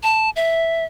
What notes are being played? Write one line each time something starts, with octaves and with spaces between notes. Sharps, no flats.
A5
E5